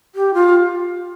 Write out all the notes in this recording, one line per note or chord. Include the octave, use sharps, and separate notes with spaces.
G4
F4